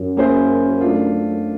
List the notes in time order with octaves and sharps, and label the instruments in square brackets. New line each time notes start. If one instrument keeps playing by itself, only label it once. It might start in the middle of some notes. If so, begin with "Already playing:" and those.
Already playing: [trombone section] F#2
[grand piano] A#3 C#4 E4 G#4 C5
A3 D4 F4